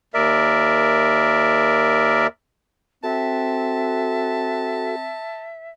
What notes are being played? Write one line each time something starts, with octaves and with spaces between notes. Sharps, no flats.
D#2 A#4 D5 E5
C4 F#4 A4 E5 A5